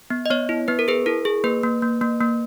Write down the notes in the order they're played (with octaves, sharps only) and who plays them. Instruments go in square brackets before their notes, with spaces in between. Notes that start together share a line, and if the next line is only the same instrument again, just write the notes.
[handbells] B3
D#5
B3 C#5
E4
B3 B4
A#4
G#4 B4
E4 A#4
G#4
A#3 B4
A#3
A#3
A#3
A#3